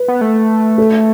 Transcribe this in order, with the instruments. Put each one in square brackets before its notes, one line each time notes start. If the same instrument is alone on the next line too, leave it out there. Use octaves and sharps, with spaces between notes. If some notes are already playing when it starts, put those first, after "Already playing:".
Already playing: [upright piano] B4
[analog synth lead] B3
A3
[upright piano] A4